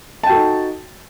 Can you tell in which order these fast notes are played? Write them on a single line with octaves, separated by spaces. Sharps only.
A5 G5 F#4 A4 D#4